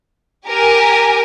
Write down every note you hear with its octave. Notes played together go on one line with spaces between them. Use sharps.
G4 A#4 G#5